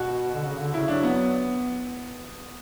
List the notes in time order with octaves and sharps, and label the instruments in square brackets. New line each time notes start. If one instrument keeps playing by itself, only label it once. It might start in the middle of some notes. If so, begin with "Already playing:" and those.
Already playing: [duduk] B2 [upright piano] F#4
[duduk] D3
C#3
D3
[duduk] C#3 [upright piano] E4
[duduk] F#3 [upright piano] D4
[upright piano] B3